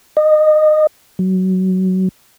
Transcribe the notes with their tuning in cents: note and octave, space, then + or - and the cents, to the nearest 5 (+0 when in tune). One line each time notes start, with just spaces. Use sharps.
D#5 -20
F#3 +15